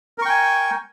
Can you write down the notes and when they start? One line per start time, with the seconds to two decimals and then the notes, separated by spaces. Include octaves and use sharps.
0.18 A#4
0.22 C#6
0.25 G5
0.29 G#5